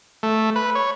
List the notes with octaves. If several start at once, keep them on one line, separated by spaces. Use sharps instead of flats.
A3
B4
C#5